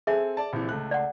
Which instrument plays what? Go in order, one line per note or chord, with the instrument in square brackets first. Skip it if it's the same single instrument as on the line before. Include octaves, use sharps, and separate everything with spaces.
[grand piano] C4 A4 G#5 [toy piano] G#4 E5
[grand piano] D5 A5
A#1 C3 E3
C#2 A3 F#6
[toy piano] D5 F#5